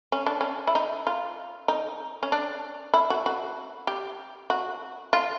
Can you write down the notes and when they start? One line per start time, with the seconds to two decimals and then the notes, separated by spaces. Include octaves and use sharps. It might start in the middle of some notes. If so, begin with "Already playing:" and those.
0.12 C#4
0.26 D4
0.41 C#4
0.67 E4
0.75 D#4
1.07 F4
1.68 D#4
2.23 C#4
2.32 D4
2.94 E4
3.10 F#4
3.26 F#4
3.87 G4
4.50 F#4
5.13 F4